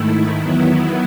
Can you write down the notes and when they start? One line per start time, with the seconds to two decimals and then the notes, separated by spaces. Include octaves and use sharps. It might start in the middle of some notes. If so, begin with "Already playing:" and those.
Already playing: G#2 D#3 A3 E4
0.39 E2 D#3 F#3 B3 E4